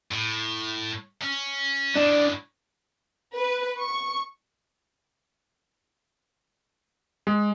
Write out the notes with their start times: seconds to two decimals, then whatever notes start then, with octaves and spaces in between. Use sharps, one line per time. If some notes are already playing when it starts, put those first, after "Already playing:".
0.11 A2
1.22 C#4
1.96 A2 D#3 D4
3.35 B4
3.80 C#6
7.27 G#3